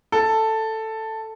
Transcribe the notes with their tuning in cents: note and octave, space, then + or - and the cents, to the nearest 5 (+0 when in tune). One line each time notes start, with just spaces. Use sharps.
A4 +5